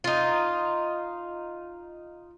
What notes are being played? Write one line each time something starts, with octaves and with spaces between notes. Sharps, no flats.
D#4 F4